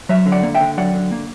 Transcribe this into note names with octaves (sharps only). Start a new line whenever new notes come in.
F#3 C#5 E5
D3
D5 F#5
A#3
E5 G5
D3
F#3 D5 F#5
D3
A#3